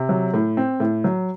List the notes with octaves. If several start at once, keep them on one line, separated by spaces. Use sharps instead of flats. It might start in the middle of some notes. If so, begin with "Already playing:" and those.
Already playing: C3
F#3
A2
C4
A2
F#3